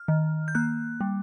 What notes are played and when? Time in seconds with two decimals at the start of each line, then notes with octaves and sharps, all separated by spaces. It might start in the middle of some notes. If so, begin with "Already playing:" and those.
Already playing: F6
0.08 D#3
0.48 G6
0.55 A#3 F#6
1.01 G3